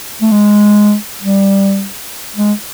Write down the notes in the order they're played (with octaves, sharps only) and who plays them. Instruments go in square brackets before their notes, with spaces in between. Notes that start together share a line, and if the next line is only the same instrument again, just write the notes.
[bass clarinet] A3
G#3
G3
G#3